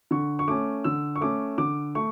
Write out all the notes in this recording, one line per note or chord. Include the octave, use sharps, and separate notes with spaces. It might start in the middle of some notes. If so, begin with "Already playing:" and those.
D3 C#6
C#6
A3 C#4 D6
D3 E6
C#6
A3 C#4 D6
D3 D6
A3 C#6